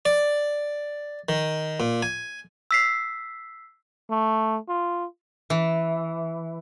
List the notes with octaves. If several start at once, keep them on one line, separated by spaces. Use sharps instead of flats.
D5
D#3
A#2
G#5
E6 B6 C7
A3
F4
E3